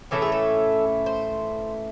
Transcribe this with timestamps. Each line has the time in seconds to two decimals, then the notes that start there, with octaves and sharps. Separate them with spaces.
0.11 A2 E3 A3 C#4 A4
0.22 G#4
0.32 A4
1.06 C5